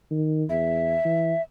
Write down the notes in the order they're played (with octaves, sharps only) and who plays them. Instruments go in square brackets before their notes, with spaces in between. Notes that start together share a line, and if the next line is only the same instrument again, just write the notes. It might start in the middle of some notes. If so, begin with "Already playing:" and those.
[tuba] D#3
[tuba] E2 [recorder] E5
[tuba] E3